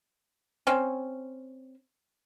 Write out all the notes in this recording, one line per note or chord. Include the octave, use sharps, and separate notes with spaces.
C4 C#4